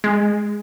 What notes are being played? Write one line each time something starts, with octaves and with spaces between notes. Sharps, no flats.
G#3